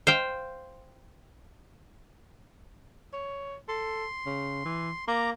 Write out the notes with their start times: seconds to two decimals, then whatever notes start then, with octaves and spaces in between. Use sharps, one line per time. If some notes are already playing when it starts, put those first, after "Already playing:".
0.07 C5 F5 G5
3.13 C#5
3.68 A4 C6
4.26 C#3
4.65 E3
5.08 A#3 A#5 D6